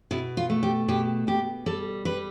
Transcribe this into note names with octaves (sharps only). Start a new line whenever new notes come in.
B2 E4
F4
A3
G4
B2 G4
B2 G4
G3 A4
G3 B4